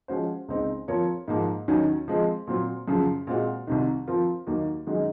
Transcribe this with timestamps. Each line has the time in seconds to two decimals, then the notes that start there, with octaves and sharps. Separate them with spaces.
0.08 F3 G#3 C#4 F#4 C5
0.48 C#2 C#3 G#3 C4 D#4
0.88 F3 C4 F4 A#4 C#5
1.28 G#2 F3 A#3
1.68 D#2 D#3 F#3 C#4
2.08 F3 G#3 C4
2.47 A#2 F#3 C4
2.88 F#2 C#3 F3
3.27 A#2 G#3 C4 F#4
3.67 C2 C3 D#3
4.07 F3 C4 F4 A#4
4.47 D#2 D#3 F#3 A#3
4.87 F#2 D#3 G#3 D#4 F#4